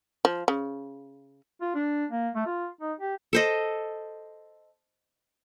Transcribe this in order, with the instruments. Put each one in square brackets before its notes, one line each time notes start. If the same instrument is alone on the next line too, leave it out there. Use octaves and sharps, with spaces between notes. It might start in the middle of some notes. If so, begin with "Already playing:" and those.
[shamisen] F3
C#3
[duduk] F4
D4
A#3
A3
F4
D#4
G4
[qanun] A4 C5 D#5